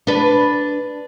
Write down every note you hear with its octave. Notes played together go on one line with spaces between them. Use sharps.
D4 B4